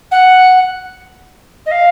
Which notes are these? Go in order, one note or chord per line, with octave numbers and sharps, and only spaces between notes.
F#5
D#5
F5